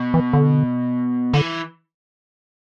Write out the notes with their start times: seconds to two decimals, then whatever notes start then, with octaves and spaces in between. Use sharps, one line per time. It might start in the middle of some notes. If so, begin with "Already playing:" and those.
Already playing: B2
0.14 E3
0.33 D3
1.33 D3 E3